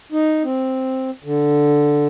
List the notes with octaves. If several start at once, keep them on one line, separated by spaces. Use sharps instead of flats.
D#4
C4
D3